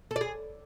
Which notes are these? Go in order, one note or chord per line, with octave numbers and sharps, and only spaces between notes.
A4
D5
G#4